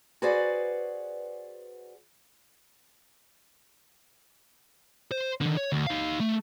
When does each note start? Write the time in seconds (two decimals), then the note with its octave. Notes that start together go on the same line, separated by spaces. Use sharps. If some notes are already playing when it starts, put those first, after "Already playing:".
0.22 F#4 G#4 B4 C5 D5 F#5
5.11 C5
5.41 D3 D#3
5.57 C#5
5.72 D2
5.87 D#4 F5
6.20 A3